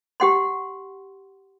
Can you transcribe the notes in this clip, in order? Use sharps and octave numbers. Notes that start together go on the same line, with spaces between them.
G4 F#5 C6